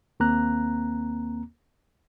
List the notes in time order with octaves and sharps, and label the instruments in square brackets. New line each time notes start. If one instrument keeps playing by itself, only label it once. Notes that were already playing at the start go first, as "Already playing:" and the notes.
[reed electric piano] D#2 A#3 C4 A#5 F#6